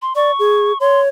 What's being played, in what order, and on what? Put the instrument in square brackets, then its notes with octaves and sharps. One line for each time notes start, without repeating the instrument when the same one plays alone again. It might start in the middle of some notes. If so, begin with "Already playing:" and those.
[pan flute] C6
[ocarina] D5 [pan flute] C#6
[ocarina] G#4
[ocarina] C#5 [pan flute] C6